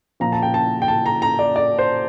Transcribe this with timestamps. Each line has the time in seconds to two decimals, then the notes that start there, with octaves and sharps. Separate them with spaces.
0.20 A#2 F3 A#5
0.32 A5
0.42 G5
0.54 A5
0.82 G5
0.88 A5
1.06 A#5
1.22 A#5
1.39 D5
1.56 D5
1.79 C5